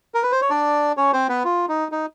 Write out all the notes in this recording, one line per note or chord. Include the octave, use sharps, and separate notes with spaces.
A#4
B4
C5
C#5
D4 D5
C#4 C#5
C4 C5
B3 B4
F4
D#4
D#4